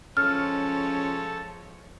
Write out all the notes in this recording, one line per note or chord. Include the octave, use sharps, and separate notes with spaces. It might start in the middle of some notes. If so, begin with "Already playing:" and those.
F3 G#3 C#4 A4 C#5 F6